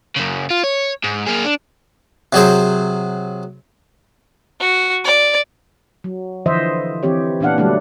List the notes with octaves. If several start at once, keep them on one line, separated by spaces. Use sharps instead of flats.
F#2 C#3
F4
C#5
G#2
A#3 G#4
D4
C3 F#3 G#4 C5
F#4
D5
F#3
D3 E3 F3 C5 D#5 E5
E3 C4 G4 C#5
A#2 E3 B3 D4 F5 F#5
D3 F#3 G3 A3 D4